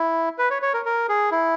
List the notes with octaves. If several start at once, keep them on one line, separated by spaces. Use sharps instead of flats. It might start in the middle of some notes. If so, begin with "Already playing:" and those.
Already playing: E4
B4
C#5
C#5
A#4
A#4
G#4
E4